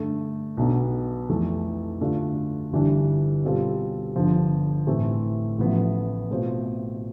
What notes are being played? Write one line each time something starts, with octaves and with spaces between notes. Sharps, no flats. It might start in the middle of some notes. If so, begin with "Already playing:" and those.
Already playing: G2 D3 A3
B1 B2 B3 D4
F2 E3 A3
G2 D3 A3 D4 F4
G1 G2 E3 G3 D4
B2 G3 C4 F4 A4
G1 G2 D3 F3
A2 E3 A3 C4
A1 A2 F3 B3
B2 A3 C4 F4 C5